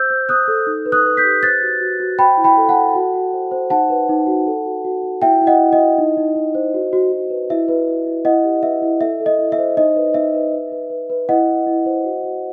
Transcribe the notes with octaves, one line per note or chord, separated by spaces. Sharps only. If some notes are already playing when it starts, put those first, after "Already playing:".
Already playing: C5 E6 G6
C5
C5 D#6 F#6
A4
D#4
B4
D#6 F#6
B4
G6 B6
G4
C5 F#6 A6
F#4
F#4
F#4
C5 G5 B5
E4
G5 B5
A4
F#5 A5
A4
F#4
F#4
C5
C5
D#4 F#5 A5
B4
D#4
F#4
A4
F#4
F#4
F#4
E4 E5 G5
E4
D#5 F#5
E4
D#5
E4
D#4
D#4
D#4
C5
F#4
F#4
F#4
B4
E4 E5
B4
E4
E4
E4 D#5 F#5
G4
B4 E5
E4
A4 E5
A4
D#5
E4
E5
C5
D#4 D#5
B4
D#4 E5
B4
B4
B4
B4
B4
E4 D#5 F#5
E4
E4
C5
F#4
F#4